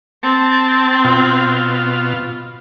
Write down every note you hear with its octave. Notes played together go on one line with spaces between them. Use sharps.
C4 A5
B2 F4